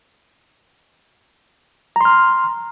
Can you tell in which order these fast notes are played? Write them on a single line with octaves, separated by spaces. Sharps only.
A#5 C6 F6